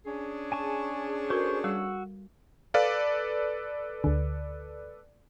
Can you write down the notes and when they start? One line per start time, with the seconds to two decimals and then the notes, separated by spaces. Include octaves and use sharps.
0.05 C#4 D4 G#4
0.52 G#5 A5 C#6
1.30 F#4 A4 A#4 C5 C#6
1.64 G3 F#4 E6
2.74 A4 B4 D5 F5
4.04 D2 D3